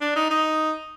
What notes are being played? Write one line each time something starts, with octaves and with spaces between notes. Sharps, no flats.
D4
D#4
D#4